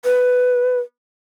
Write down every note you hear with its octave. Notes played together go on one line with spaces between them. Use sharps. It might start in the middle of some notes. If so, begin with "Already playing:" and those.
B4